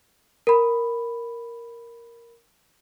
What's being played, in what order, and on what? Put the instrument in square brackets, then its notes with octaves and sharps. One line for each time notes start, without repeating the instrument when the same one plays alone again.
[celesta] A#4 B5